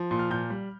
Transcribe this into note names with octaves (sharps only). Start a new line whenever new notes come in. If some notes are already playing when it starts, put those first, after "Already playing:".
Already playing: F3
A#2
F6
A#2 G6
G3